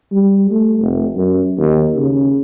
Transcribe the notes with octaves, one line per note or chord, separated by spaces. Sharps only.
G3
A3
F1
F#2
D#2
C#3